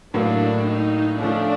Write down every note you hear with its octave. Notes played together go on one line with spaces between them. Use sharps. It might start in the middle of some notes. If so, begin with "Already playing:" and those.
A2 F#3 A#3 D4
D#4
F3 A3 C#4 D4 F4